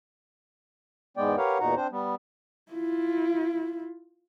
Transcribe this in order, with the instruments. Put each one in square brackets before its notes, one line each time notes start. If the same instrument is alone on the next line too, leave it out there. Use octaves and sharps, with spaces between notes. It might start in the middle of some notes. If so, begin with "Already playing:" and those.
[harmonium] E2 G#2 G#3 B3 D5 G5
G4 A#4 B4 C#5 F5 F#5
E2 A#2 D#4 F#4 F#5 A#5
C4 D4 C5
G3 B3
[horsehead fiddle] E4 F4